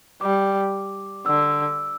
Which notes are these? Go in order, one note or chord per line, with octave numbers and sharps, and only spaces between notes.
G3 D6
D3 E6